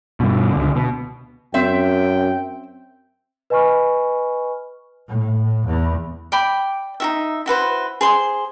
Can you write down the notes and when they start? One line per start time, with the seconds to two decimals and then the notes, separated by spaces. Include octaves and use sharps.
0.20 G2 B2
0.52 C#2 D3
0.75 B2
1.54 F#2 C4 E5 G5
3.50 B4 D#5 G#5 B5 C#6 F6
5.08 A2
5.66 E2
6.32 D5 G5 B5
7.00 D#4 F#4 E5
7.46 E4 F#4 B4 C5
8.01 G#4 C5 C6